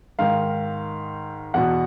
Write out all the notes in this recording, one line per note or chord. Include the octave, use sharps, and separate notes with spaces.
G#2 D#3 F5
E2 B2 F#5